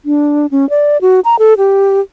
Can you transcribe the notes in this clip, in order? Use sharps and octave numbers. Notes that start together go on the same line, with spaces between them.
D4
C#4
D5
F#4
A#5
A4
G4